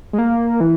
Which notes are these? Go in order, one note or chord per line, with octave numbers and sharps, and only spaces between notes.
G#3
A#3
E3